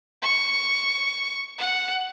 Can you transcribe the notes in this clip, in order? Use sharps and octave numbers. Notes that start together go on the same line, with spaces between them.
C#6
F#5